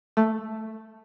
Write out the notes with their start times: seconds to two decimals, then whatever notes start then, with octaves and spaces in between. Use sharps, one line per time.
0.17 A3